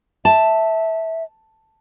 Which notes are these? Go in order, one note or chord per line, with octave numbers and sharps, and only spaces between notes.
E5 A5